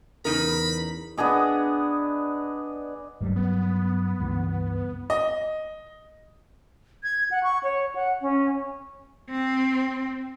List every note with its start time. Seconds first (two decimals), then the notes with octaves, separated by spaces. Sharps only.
0.25 E2 C#3 D#4 A#4 B5
1.17 B3 D4 G#4 D#5
3.21 D1 G2 F#3 G3
3.36 B3
4.20 C#2 G2 E3
5.10 D#5
7.03 G#6
7.31 F#5
7.43 C#6
7.63 C#5
7.95 F#5
8.21 C#4
9.30 C4